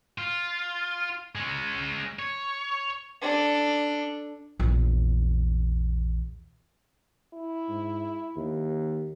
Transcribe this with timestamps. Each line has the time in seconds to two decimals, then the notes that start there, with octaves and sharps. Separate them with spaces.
0.18 F4
1.35 G#3 C#4
2.19 C#5
3.21 D4 A4
4.59 A#1 E2
7.34 E4
7.69 G#2
8.36 D#2